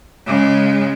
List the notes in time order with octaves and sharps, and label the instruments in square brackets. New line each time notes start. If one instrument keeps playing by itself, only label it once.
[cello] C#3 G#3